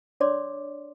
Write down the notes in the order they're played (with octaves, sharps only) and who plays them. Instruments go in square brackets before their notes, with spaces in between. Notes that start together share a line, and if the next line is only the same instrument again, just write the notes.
[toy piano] D4 C#5 D5 C6 D6